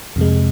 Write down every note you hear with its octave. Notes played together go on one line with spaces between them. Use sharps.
F2 C3 G#3